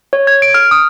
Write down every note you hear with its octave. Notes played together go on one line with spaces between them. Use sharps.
C#5
G#6
D7
F6
D#6